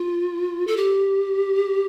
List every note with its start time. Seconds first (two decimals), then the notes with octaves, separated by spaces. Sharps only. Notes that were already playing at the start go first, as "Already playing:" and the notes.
Already playing: F4
0.67 A4
0.77 G4